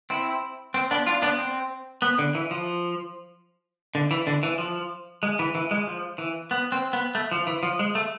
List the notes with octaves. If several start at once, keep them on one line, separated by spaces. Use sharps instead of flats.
C4 E4
C4
B3 D4
D4 F4
B3 D4
C4
B3
D3
E3
F3
D3
E3
D3
E3
F3
G#3
E3
E3
G#3
F3
E3
B3
C4
B3
A3
F3
E3
F3
G#3
A3